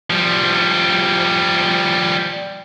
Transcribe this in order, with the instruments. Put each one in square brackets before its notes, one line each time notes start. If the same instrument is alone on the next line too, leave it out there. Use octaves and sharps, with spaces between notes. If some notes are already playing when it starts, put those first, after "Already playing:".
[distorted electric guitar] F3 G3